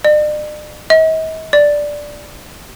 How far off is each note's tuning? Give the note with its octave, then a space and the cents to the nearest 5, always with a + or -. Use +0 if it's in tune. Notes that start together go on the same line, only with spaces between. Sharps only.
D5 +45
D#5 +45
D5 +0